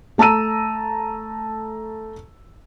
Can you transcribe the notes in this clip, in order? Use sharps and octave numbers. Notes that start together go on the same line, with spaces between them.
A3 A5 A#5 E6 D#7